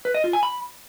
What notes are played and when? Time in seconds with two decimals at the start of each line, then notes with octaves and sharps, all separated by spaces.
0.05 B4
0.14 D#5
0.24 F4
0.33 G#5
0.43 B5